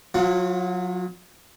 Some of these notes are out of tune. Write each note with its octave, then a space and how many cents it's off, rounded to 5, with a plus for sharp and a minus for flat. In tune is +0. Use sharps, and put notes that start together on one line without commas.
F#3 -30 F4 +0 F#5 +10